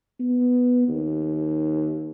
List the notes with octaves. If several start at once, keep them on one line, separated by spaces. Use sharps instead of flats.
B3
D#2